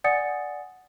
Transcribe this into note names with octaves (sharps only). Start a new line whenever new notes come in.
D5 F#5 G#5 D#6 A6 C#7